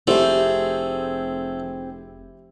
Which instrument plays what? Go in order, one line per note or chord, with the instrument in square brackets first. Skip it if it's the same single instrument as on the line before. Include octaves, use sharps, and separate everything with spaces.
[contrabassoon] F1 [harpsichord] A3 [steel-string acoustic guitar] C4 G#4 [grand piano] E4 G4 C5